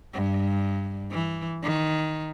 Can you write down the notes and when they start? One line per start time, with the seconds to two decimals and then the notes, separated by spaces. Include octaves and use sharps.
0.14 G2
1.11 E3
1.63 D#3